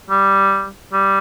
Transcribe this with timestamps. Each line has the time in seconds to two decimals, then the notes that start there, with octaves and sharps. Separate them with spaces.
0.10 G3
0.93 G3